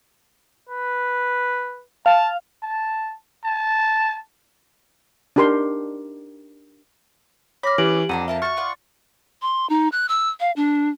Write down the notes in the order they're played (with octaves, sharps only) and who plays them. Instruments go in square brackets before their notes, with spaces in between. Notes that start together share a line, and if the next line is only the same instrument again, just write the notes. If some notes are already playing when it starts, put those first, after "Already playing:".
[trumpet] B4
[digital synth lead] F5 [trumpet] A5
[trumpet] A5
A5
[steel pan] D4 D#4 G4 A#4 C6
[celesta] C#5 A#6 [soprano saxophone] B5 [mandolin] D6 F6
[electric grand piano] E3 [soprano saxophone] C#4 [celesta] G4 D7 F#7
[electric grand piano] F2 [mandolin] D4 A4 A#5 [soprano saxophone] F#5 [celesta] D#7
[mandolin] A4 A#4 A5 [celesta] E5 [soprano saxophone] F5
[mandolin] F#4 F#5 [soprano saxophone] C#6 [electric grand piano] F6 A6
[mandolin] F4 D5 F#5
[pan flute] C6
D#4
F#6
E6
F5
D4